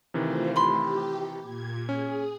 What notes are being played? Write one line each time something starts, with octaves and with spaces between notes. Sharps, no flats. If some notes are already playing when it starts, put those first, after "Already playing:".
C3 D#3 E3 A3 F4 C5
G4 B5 C6
A#2 G#6
C#4 G#4